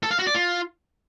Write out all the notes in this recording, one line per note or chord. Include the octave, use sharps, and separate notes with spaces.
A4
F5
F#4
D5
F4